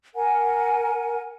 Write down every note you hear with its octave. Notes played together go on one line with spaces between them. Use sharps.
A#4 F#5 G#5